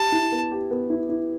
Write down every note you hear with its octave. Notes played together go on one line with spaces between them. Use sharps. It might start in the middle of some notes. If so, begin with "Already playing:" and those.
Already playing: G4 A5
E4
B3
G4
B3
E4
E4